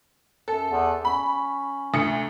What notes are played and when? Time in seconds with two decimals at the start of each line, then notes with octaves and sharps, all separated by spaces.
0.48 F#2 A4
0.71 E2
1.05 C#4 B5
1.94 D2 C#7